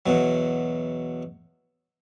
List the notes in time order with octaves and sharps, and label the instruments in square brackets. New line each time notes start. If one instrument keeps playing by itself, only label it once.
[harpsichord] E2 B2 F#3